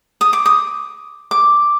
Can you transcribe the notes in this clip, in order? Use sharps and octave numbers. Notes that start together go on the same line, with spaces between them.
D#6
D6
D#6
D6